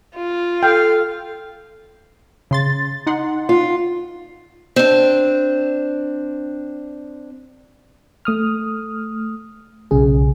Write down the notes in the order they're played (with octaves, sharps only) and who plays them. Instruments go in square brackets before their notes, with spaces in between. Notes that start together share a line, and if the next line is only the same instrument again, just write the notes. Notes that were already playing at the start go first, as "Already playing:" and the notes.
[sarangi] F4
[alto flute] A4 [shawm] F5 [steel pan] G5
[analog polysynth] C#3 C6 A6
D#4 F#5 C6
[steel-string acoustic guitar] F4
C4 D4
[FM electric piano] A3 D#6 F6
B1 C#3 G#4